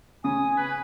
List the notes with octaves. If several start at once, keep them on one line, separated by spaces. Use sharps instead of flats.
C#3 G#5 D#6
B4